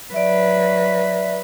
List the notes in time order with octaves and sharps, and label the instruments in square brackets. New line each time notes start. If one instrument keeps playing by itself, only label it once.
[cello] F#3 B4 [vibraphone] D5 E5